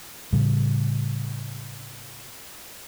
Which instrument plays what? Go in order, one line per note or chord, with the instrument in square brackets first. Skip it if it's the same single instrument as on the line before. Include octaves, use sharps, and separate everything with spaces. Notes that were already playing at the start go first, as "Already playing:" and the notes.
[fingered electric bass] A2 C#3 G3